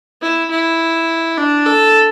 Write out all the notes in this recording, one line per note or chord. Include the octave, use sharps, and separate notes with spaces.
E4
E4
D4
A4